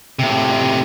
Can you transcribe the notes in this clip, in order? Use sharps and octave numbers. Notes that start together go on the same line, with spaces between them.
A2 C3